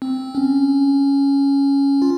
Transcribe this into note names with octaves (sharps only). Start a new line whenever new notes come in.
C4
C#4
F4